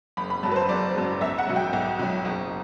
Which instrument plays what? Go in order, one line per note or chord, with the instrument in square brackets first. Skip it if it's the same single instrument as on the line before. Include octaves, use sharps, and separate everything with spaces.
[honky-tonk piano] F#1 B5
B5
F#2 F#3 A5
B4
C5
F#1 D5
F#2 F#3
B1 E5
F#5
B2 F#3
G5
B1
B2 F#3
F#1